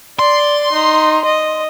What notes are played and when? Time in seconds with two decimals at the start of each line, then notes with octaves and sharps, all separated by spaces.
0.19 D5 C6
0.73 D#4
1.25 D#5